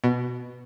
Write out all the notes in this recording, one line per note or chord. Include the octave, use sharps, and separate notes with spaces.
B2